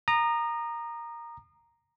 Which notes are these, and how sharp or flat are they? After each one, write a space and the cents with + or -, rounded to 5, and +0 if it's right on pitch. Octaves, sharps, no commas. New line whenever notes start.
A#5 +0 D#6 -30